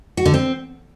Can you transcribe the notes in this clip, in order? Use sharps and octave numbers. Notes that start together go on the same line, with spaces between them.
F#4
D3
C4